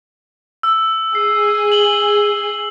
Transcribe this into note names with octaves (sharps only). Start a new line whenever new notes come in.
E6
G#4 C7
F#7 G7